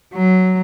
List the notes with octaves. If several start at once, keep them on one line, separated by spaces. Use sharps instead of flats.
F#3